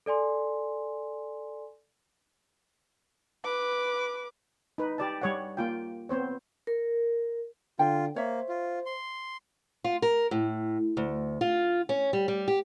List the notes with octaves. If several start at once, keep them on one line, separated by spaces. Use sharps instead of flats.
A4 D5 G#5 C6
B4 D6
D#4 B4
G4 D5 A5
G3 C#5 F#5
A#3 F4 G5
B3 C4 C5 C#5
A#4
D3 F4 G5
A#3 C5 C#5 E5
F4
C6
F4
A#4
A2
D2
F4
C#4
G3
G3
G4